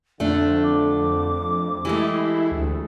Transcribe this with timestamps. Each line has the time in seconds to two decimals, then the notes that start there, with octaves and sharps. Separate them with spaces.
0.20 F2 D3 A3 D4 E5
0.63 D6
1.85 E3 G#3 A3 E4 G4
2.51 D2